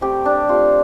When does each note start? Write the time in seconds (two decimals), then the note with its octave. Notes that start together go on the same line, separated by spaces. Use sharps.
0.01 C3 A3 G4
0.25 D4
0.49 C3 A3 F4